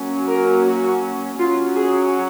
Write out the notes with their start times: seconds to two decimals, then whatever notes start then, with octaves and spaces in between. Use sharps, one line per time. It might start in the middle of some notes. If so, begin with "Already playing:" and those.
Already playing: F#3 A#3 C#4
0.29 A#4
0.66 F#4
1.39 F#3 C#4 F4
1.76 G#4